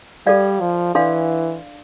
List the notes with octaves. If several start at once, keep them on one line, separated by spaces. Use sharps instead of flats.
G3 A4 D5 F5
F3
E3 D4 A4 D5 F5 C6